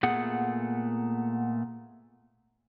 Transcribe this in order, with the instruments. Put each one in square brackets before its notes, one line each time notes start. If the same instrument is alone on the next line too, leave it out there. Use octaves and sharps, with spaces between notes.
[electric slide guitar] A#2 A3 B3 G#4 F#5